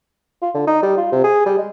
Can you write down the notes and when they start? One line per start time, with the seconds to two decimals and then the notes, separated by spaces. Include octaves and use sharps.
0.42 F4
0.54 D3
0.67 D#4
0.83 G3
0.98 F4
1.12 C3
1.24 G#4
1.46 G3
1.58 G#3